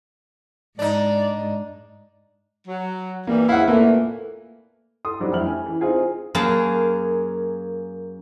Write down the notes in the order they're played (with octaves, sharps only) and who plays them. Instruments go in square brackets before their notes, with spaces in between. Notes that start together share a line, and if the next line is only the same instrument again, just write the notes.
[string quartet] G#2 [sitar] D4 D#4 [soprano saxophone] D5
[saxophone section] F#3
[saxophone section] E3 G3 [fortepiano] A#3
[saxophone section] E2 G#2 E4 [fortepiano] F5 F#5
[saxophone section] A#2 E3 [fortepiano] A3 A#3
[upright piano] A4 C6 D#6
F#3 G3 C4 D4 D#4
F2 A3 E4 F6 F#7
C#4 A4 G#5
E3
C4 D#4 F4 G#4 C5
[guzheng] F#2 A#3 G#4 A5